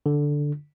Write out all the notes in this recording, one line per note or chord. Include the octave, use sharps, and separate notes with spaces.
D3